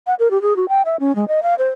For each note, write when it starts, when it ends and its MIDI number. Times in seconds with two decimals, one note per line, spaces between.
0.07 0.14 78
0.19 0.30 70
0.31 0.40 67
0.42 0.56 68
0.56 0.68 66
0.68 0.82 79
0.85 0.96 76
1.00 1.15 61
1.16 1.28 56
1.28 1.43 75
1.43 1.55 77
1.58 1.69 72